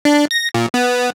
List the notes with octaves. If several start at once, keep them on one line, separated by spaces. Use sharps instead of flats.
D4
A#6
A#2
B3